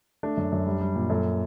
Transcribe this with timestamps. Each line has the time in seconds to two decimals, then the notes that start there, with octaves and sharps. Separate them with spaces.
0.23 A3 D4
0.37 F#2
0.52 F#2
0.66 G3
0.81 G3
0.96 A#2
1.10 F#2 A4